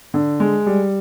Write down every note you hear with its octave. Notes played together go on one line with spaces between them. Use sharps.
D3
G#3
G3